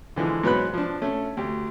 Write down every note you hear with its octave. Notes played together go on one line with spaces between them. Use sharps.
D3 E3 F3 G#3
G#2 F#3 B3 B4 B5 F#6
F3 D4
A3 C#4
D2 G4